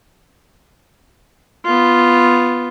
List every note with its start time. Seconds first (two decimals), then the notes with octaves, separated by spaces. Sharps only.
1.65 B3 F4